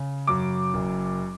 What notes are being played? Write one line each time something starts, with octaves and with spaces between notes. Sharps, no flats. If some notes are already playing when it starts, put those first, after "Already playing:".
Already playing: C#3
F#2 D6
F#1